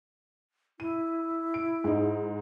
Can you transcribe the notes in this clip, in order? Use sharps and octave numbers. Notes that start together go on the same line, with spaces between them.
E4 D#7
D7
G#2 D#4